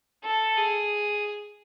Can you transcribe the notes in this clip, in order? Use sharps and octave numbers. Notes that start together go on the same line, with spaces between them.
A4
G#4